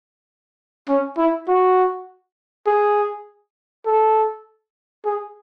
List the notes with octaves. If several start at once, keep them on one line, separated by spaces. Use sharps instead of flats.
C#4
E4
F#4
G#4
A4
G#4